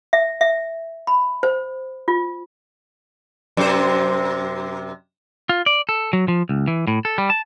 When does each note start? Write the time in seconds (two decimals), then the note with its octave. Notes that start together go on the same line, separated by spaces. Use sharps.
0.13 E5
0.41 E5
1.07 B5
1.43 C5
2.08 F4
3.57 F#2 C3 C5
5.49 F4
5.66 D5
5.89 A4
6.13 F#3
6.28 F3
6.49 C#2
6.68 E3
6.87 A2
7.05 A4
7.18 G3
7.30 A5